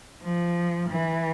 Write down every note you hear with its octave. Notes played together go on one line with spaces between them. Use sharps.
F3
E3